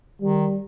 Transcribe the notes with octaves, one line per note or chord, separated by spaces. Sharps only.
D#3 G3